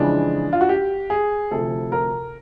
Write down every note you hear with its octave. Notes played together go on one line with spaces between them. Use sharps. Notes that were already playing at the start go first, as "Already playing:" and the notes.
Already playing: F2 C#3 E3 G#3 D4
F4
F#4
G4
G#4
D2 C3 F3 A4
A#4